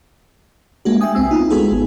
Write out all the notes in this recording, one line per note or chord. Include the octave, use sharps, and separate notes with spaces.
G#3 A#3 D4 F#4
E5 G5 G#5 D#6
C2 B3 C4 E6
D#4 F4
G#3 B3 F4 F#4 G#4 A4
G#1